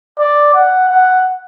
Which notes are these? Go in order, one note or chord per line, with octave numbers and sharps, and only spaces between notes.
D5
F#5
F#5